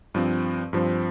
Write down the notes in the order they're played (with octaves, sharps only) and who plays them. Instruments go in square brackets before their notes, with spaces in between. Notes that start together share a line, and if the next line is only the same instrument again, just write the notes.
[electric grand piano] G2 F3 C4
G2 F3 C4